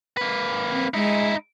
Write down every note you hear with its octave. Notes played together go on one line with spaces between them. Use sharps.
A#3 B4
C4
G#3 D#4 E4